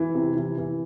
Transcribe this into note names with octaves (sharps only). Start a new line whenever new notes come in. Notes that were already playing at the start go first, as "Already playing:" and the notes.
Already playing: E3
C3
E3
E3